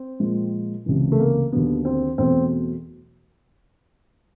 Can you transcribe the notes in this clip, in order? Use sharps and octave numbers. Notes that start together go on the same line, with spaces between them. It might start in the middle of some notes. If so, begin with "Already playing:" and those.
Already playing: C4
A#2 F3 G#3
C#2 C3 E3
A3
A#3
D#2 D3 F#3 B3
C4
E2 B2 F#3 A3 C4